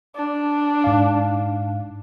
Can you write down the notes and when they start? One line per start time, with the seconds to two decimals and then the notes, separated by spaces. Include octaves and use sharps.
0.15 D4
0.84 G#2 F5